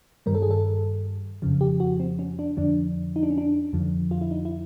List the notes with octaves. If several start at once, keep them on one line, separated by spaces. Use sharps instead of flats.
G2 D#3 G3 A#4
A4
G#4
A4
F2 C#3 F3
G4
F#4
C4
C#4
D4
F2 D3 F3 D4
D#4
D4
C#4
D4
F2 D3 F3
F4
E4
D#4
E4